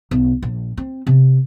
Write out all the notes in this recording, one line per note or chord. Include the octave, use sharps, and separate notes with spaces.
B1
A#1
C4
C3